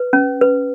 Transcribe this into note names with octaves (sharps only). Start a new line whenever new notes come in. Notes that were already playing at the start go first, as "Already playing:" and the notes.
Already playing: B4
C#4
B4